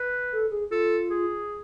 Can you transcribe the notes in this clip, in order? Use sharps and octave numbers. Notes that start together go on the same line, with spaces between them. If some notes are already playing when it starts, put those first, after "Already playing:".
Already playing: B4
A4
G#4
F4 A4
G#4